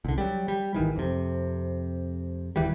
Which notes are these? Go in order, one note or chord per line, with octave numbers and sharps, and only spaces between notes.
C2 D3
F#3 G3
G3
G#1 D2 D#3 E3
F2 C3
D#1 E3 G3